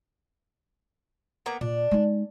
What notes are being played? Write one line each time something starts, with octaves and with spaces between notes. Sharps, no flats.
A#3 B3 A#5
A#2 D4
G#3 D#4